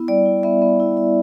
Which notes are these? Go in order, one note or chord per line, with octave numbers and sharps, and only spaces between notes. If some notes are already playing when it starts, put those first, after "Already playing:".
Already playing: B3 E4
G3 D5
E4
B3 E5
B3
E4
E4